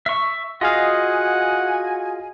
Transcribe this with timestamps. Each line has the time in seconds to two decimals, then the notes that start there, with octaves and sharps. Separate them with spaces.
0.06 E5 C#6
0.61 F4 F#4 G#4 D#5 F5 F#5 G#5